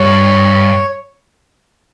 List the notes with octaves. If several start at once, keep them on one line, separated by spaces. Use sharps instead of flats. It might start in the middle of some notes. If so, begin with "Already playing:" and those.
Already playing: G2 C#5